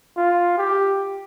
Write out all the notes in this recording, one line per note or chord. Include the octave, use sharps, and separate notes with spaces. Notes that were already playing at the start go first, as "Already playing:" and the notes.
F4
G4